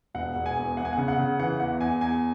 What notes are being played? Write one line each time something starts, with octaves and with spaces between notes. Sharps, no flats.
E1 F#5
E1
G#5
E2
E2 F#5
G#5
C#3 F#5
F#5
C#3
E3 F#5
E2 F#5
E2 G#5
E2 G#5